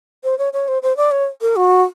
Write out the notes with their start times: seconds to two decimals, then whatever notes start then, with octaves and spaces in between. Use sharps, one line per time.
0.24 C5
0.39 C#5
0.53 C#5
0.68 C5
0.83 C5
0.97 D5
1.11 C#5
1.41 A#4
1.56 F#4